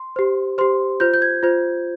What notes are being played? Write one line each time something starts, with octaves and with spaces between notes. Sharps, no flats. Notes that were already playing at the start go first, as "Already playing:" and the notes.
Already playing: C6
G4 C5
G4 C5 C6
F4 C5 G6
G6
G#6
F4 C5